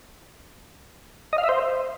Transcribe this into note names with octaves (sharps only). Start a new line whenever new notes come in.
D#5
F5
E5
C5